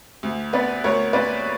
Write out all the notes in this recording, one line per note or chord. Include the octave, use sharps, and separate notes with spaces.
D2
B3 B4 D5
D2 A#4 C#5
A#3 B4 D5